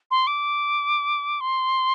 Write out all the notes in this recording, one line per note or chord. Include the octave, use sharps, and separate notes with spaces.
C6
D6
C6